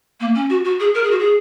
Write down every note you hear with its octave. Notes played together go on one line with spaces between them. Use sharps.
A#3
C#4
F#4
F#4
G#4
A#4
G#4
F#4
G#4